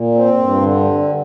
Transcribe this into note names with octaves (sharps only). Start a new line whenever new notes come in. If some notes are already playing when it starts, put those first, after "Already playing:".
Already playing: A#2
C4
G2
D3